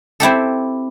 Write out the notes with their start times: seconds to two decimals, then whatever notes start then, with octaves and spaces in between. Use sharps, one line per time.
0.20 C4 E4 G4 A4